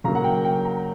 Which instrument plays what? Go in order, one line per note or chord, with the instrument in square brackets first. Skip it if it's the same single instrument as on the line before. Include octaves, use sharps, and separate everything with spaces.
[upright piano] C#3 F#3 A#3 A#5
F#5
G5
G5
A#5